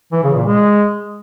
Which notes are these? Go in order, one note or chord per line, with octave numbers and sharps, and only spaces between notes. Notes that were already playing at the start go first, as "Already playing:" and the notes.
E3
C#3
A#2
G#3